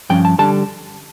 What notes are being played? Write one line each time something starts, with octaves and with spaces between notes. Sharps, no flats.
G2 F3 C#4 G5
A5
D3 G3 D4 A5